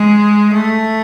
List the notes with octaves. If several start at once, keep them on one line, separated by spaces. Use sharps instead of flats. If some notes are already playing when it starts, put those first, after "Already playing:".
Already playing: G#3
A3